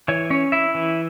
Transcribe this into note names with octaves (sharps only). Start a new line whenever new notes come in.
E3 C#5
C#4 C#5
E4 E5
E3